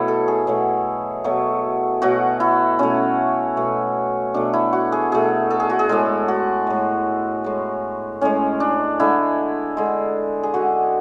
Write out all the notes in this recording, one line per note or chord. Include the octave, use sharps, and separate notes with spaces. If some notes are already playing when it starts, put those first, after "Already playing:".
Already playing: B2 F#3 A3 E4
A4
G#4
B2 F#3 A3
B2 F#3 A3
B2 F#3 A3 F#4
E4
B2 A3 C#4
B2 A3
B2 A3 D4
E4
F#4
G#4
B2 A3 G#4
A4
G#4
F#4
G#4
A2 G#3 A4
F#4
A2 G#3
A2 G#3
A2 G#3 C#4
D4
D3 G#3 E4
D3 G#3
G#4
D3 G#3 F#4